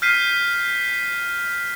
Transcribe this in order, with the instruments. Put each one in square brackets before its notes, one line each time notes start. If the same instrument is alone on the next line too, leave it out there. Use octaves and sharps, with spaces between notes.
[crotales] F6 G6 B6 C7 D#7